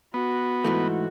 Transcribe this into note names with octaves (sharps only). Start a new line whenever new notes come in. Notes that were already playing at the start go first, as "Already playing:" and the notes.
B3 F#4
G#2 E3 A3